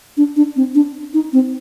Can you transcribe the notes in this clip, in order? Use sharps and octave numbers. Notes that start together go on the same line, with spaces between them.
D4
D4
C4
D4
D#4
C4